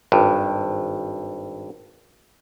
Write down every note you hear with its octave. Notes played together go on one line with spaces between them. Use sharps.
G#1 G2